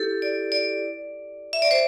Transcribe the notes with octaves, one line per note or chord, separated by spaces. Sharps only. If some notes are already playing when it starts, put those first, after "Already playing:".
Already playing: E4 G4 A4
D5
D5
E5
D5
C5